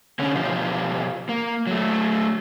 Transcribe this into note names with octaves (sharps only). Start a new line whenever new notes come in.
D3 C#4
B2 F3 F4 G4
A#3
F#3 A3